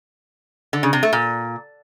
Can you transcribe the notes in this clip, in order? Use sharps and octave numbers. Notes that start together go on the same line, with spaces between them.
D3
C#3
C3
A3
A#2